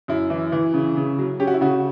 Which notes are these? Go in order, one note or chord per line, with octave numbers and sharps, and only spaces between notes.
F#2 E4
E3
E3
C#3
C#3
F#3
C#4 G4
F#4
E4
C#3 F#4